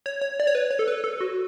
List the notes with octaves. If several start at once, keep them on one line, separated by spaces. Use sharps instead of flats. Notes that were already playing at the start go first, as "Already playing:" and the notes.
C#5
C#5
D5
C#5
B4
C#5
A4
B4
A4
F#4